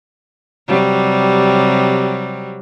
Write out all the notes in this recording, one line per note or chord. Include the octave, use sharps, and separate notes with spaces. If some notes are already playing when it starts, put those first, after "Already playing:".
C3 F#3 G3